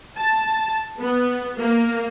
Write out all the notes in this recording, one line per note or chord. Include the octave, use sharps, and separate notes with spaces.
A5
B3
A#3